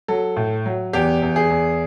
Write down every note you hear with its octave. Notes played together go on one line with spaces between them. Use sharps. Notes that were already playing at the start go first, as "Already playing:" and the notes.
F#3 A4
A2
F#3
E2 G4
E2
G#4
E2